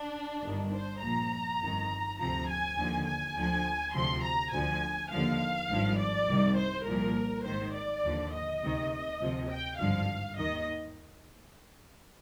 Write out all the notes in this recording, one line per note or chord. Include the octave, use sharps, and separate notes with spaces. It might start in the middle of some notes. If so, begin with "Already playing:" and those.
Already playing: D4
G1 G2 D#3
C5
A#1 A#2 F3 A#5
G1 F2 D#3
D2 C3 F3 A#5
G#5
D#2 D3 F3
G#5
D2 D3 F3
D2 C3 F3 C6
A#5
D2 D3 F3 G#5
D#2 D3 F3 F5
G#1 G2 F3
D5
C2 C3 D#3
C5
C2 A#2 F3 A#4
G#1 G#2 D#3 C5
D5
D#2 D3 F3
D#5
D2 C3 D#3
D2 C3 F3
G5
G#1 G2 D3 F3 F5
D#2 D#3 D#5